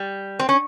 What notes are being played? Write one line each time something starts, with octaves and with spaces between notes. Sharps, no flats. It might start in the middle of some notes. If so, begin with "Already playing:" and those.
Already playing: G3
C4
C#4